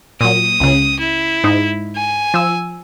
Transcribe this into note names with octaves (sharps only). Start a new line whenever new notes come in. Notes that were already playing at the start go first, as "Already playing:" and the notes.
A#2 F#3 D#6
C#2 C#3
E4
G#2 D#4
G#5
F3 E6